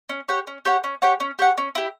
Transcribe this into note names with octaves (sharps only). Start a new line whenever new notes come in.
C#4
G4 C#5 F#5
C#4
G4 C#5 F#5
C#4
G4 C#5 F#5
C#4
G4 C#5 F#5
C#4
E4 G4